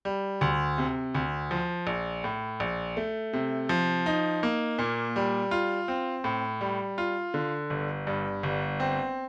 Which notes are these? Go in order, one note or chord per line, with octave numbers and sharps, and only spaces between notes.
G3
D2
C3
D2
F3
A#1
A2
A#1
A3
C3
F3
D#4
A#3
A#2
G3
F4
C4
A2
G3
F4
D3
G1
G2
G1
C4